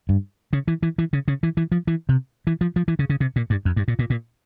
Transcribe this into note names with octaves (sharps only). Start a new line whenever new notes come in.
G2
C#3
E3
E3
E3
C#3
C#3
E3
E3
F3
E3
C3
E3
F3
F3
E3
C#3
C#3
C3
A#2
G2
F2
G2
A#2
A#2
A#2